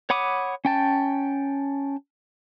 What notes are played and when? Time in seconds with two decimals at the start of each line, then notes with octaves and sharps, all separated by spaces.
0.10 C#5 F#5 B5 D6 D#6
0.65 C#4 G5 A5